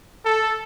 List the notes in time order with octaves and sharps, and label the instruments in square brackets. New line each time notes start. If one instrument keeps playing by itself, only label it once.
[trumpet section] A4